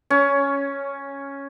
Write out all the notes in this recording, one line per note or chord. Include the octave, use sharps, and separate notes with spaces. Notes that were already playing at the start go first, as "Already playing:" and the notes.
C#4